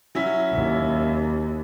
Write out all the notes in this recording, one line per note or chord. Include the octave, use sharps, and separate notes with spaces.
F#3 C#4 E4
D#2